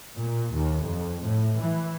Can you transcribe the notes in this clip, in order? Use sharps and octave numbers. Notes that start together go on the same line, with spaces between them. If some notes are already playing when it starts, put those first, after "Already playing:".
A#2
D#2
F2
A2
E3